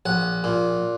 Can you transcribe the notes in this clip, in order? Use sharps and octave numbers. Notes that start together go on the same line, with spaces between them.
A#1 F#5
A#2